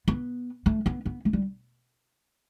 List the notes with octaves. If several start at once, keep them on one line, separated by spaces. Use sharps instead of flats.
B3
A3
B3
B3
A3
G3